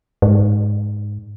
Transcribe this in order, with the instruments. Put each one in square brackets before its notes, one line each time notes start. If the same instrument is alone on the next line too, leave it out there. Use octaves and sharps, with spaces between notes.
[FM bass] G#2